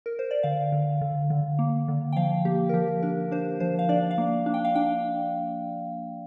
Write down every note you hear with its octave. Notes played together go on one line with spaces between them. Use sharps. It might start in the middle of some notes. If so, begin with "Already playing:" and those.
A#4
C5
D5
D3 F5
D3
D3
D3
A#3
D3
G5
F3 F5
A#3 G4
A#4
F3 G4
D4 A#4
D4 C5
F3 C5
F5
D4 D5
F5
A#3
D4
G5
F5
D4 G5